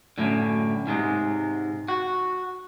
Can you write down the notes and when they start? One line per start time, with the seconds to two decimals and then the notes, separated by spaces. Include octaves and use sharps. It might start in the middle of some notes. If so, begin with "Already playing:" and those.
0.18 F#2 A2 D3
0.87 G#2 C3 G#3
1.88 F#4